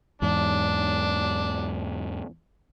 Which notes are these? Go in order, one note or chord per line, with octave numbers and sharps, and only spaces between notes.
E2 G#2 D4